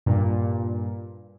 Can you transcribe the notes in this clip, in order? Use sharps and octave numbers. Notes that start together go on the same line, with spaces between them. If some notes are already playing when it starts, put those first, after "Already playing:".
G2 A#2